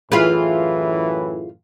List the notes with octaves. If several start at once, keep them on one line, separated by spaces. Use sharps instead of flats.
F#2 A2 E3 F4 G#4 B4